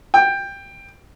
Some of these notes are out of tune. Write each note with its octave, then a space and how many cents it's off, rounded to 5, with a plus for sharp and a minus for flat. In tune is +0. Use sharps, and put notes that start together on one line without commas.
G5 +15